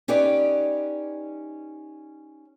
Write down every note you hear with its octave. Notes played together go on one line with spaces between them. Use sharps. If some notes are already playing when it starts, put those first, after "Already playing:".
C#4 D#4 G4 B4 D5